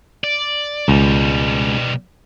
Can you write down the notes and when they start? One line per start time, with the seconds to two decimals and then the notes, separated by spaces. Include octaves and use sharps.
0.24 D5
0.88 C#2 B2 G3